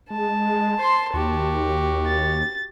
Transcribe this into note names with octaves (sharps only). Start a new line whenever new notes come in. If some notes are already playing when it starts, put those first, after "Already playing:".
G#3 A5
C5 C6
D#2 F#4 G4
A6